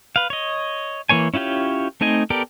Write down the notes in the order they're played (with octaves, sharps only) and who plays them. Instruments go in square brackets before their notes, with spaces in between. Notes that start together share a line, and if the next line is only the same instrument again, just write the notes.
[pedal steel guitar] B4 F5
C#5 D#5
E3 A#3 C#5 G#5
C#4 E4 F4 G4 C#5
A3 C4 D#4 D#5 G#5
B3 G4 A4 A#4 D5